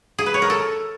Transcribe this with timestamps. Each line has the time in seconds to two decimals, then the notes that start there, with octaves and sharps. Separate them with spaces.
0.18 G#4
0.26 B4
0.34 C#5
0.42 A#4
0.50 A4